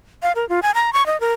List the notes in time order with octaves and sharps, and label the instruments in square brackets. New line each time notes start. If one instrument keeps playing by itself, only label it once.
[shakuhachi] F5
A#4
F4
G#5
A#5
C#6
D#5
A#4